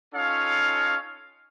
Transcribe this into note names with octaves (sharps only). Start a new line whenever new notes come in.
C#4 D#4 F4 A4 C#5 F5